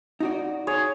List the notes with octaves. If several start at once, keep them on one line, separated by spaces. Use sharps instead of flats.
D#4 F#4 D5
G#4 C#5